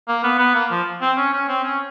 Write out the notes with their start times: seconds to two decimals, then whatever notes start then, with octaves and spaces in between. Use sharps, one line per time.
0.08 A#3
0.24 B3
0.39 B3
0.55 A#3
0.71 F3
1.01 C4
1.17 C#4
1.33 C#4
1.48 C4
1.63 C#4